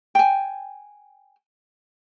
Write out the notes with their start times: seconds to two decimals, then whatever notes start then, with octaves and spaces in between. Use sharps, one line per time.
0.15 G5 G#5